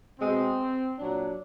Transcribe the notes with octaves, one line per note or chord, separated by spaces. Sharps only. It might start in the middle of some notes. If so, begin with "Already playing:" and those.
B2 G#3 C4
A#2 F#3 D4